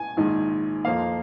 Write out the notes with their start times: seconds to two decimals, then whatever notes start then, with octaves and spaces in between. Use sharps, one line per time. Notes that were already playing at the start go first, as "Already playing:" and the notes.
Already playing: G#5
0.17 A#1 G#2 D#3 G#3
0.85 F2 F3 A#3 F5